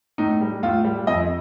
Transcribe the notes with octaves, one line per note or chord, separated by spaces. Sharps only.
A2 D#4
G3
A2 F4
G3
F2 D#5